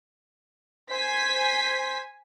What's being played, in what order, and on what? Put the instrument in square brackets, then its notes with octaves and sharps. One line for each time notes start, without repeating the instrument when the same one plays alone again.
[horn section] C5 [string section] G#5 B6